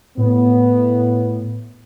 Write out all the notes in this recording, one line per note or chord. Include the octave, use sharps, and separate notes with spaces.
A2 B3